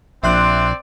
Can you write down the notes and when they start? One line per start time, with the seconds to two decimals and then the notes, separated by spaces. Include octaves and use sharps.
0.23 A#1 C4 D5 E5 C6 F#6